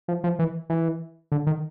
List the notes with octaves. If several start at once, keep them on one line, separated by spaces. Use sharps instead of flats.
F3
F3
E3
E3
D3
D#3